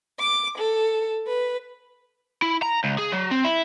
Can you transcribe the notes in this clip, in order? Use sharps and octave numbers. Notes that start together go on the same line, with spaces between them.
D6
A4
B4
E4
A#5
C#2
G#4
F#3
C4
E4